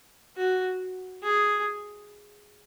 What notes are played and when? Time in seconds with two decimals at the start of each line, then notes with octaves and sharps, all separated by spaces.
0.37 F#4
1.23 G#4